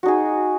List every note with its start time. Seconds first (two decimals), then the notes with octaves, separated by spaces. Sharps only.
0.03 F#4
0.06 D#4
0.08 G#4